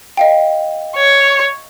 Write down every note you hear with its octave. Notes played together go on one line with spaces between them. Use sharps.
D#5 F5 G5
C#5